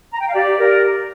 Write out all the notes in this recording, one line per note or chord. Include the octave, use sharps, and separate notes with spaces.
A#5
G5
F5
G4 D5
A#4